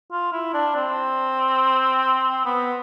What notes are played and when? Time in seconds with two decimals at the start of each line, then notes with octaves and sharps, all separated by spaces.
0.12 F4
0.32 E4
0.54 D4
0.76 C4
2.45 B3